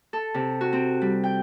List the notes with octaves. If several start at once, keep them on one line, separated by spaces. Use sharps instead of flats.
A4
C3
F#4
C4
G3
G5